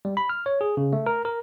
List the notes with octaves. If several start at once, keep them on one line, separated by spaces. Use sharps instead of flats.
G3
B5
F6
C#5
G#4
C#3
A3
A#4
A#4